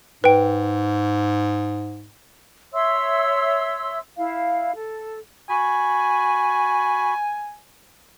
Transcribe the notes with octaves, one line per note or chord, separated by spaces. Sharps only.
G#2 B4 G5
C#5 E5 C6 E6
E4 F5
A4
F#4 G#5 B5